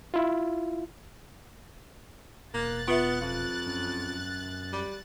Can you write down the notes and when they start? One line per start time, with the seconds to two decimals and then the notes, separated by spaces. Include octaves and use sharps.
0.14 E4 F4
2.54 E1 A#3 F#6 A6
2.88 B3 F4 B4 E5
3.21 F2 F5
3.67 F#2
4.73 G3